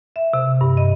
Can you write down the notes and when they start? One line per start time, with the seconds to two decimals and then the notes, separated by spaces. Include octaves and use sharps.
0.16 E5
0.33 C3
0.61 G2
0.77 D#5